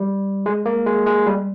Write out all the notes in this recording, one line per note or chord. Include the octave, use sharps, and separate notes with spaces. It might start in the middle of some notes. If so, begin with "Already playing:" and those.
Already playing: G3
G#3
A#3
G#3
G#3
G3